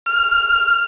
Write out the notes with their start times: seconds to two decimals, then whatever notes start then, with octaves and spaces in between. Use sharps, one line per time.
0.06 F6